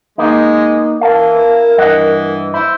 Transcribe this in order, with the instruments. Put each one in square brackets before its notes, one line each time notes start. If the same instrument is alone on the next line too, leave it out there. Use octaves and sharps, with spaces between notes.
[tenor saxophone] G#3 [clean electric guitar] A#3 B3 D#4
[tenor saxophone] E3 [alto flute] A#4 [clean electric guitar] F5 A5
[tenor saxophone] E4
[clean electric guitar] G2 D#5 F#5 [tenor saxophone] E3
[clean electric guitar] E4 [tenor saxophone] C5